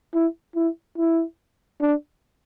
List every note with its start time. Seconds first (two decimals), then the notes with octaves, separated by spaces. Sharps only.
0.14 E4
0.55 E4
0.98 E4
1.81 D4